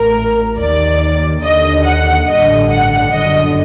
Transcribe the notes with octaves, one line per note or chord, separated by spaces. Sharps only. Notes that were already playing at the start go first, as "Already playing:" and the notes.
Already playing: A1 A2 A#4
D#2 D#3 D5
D#2 D3 D#5
F#5
A1 G2 D3 D#5
F#5
G1 F#2 D3 D#5